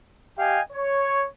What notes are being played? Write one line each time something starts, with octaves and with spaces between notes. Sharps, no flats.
G4 D#5 F5 G5 G#5
C#5